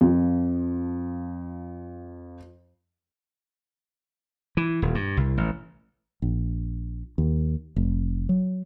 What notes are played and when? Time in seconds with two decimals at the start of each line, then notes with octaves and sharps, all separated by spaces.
0.01 F2 F3
4.57 E3
4.82 D#1
4.95 G2
5.17 C2
5.37 A1
6.22 A#1
7.18 D#2
7.76 F1
8.29 F#3